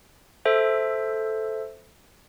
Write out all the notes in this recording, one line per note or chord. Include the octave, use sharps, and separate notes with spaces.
A4 C5 E5